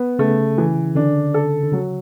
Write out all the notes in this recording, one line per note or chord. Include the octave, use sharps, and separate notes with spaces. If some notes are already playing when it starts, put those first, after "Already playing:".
Already playing: B3
C#3 A3
E3
D3 D4
A4
D3
C#3 F#3